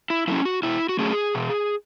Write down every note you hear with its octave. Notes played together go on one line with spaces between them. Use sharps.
E4
F#3 A3 C#4 E4
F#4
B2 E4
F#4
F#3 A3 C#4 G#4
B2